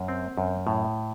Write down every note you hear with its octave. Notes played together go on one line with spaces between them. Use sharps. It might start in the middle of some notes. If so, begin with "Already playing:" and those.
Already playing: F#2
C4
F#2
A2